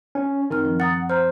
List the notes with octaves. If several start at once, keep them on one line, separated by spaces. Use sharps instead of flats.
C#4
F#2 D#3 C4 F6
F3
F#5 A#5 D#6 A6
C5 A#5 F6